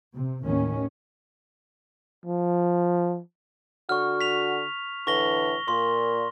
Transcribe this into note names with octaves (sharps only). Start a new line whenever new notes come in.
C3
D#2 A2 D#3 C#4
F3
D3 F#4 C#6 F6
B6 F7
A2 D3 E3 C#6 A#6 G7
A#2 C6